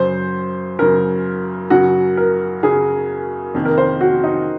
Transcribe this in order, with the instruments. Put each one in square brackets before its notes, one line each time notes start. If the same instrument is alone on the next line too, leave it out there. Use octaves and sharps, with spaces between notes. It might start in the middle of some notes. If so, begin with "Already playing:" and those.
Already playing: [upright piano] F#2 C#3 F#3 [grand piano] C5
[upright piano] F#2 C#3 F#3 [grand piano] A#4
[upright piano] F#2 C#3 F#3 [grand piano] F#4
[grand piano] A#4
[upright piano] F#2 C#3 F#3 [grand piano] G#4
[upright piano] F2 C3 D#3 A#3
[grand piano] A#4
C5
F#4
D#4